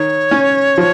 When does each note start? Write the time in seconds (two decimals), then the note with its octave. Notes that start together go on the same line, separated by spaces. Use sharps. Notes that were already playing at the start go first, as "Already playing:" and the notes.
Already playing: D#3 C#5
0.31 C#4
0.78 F3